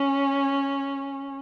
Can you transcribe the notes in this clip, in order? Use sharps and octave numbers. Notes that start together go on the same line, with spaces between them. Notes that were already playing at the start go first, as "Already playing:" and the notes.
Already playing: C#4